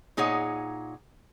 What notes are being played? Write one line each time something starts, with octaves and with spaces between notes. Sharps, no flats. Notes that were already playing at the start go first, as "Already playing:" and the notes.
A#2 D#4 G#4 C#5 F#5